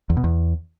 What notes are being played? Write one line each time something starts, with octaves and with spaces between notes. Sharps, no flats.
E2
B2
E2